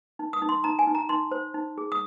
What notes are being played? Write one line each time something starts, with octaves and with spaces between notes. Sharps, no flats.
D#4
D#6
D#4
C6
D#4 A#5
G#5
D#4
A#5
D#4 C6
C5
D#4
G#4
D#6